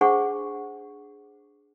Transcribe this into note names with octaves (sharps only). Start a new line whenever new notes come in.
D4 G#4 C5 F#5 C#6